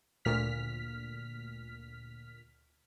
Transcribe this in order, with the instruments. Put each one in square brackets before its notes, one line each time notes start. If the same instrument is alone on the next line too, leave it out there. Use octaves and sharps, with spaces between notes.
[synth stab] D2 A#2 F6 B6